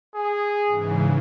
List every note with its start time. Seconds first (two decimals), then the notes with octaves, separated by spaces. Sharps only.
0.14 G#4
0.66 G#2 C#3 E3